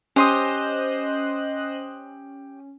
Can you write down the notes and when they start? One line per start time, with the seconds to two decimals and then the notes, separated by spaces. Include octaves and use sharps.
0.16 C#4 G4 C5 D#5 C6 D#6 F#6